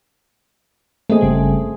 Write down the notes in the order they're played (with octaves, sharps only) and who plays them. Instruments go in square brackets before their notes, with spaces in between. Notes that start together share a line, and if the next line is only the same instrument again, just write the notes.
[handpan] A3 C4 G#4 [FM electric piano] A#3 D#5
[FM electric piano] G1 C#3 G3